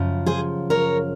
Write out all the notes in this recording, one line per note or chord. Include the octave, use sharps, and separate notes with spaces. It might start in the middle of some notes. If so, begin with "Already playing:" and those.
Already playing: F#2 C#3 F3
G#4 C5
A#4 C#5